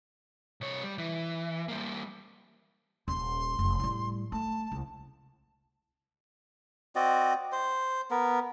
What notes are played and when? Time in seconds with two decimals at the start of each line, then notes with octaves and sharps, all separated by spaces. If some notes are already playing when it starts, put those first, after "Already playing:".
0.61 C2 C#5
0.83 G3
0.98 E3
1.68 G3 A#3
3.08 D#1 C6
3.59 F1
3.80 A2 G3
4.32 A3 A5
4.72 C2
6.96 C4 F#4 D5 D#5
7.52 C5
8.11 B3 A#4